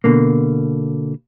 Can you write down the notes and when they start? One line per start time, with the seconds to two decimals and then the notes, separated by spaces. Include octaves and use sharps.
0.04 B2 D3 A#3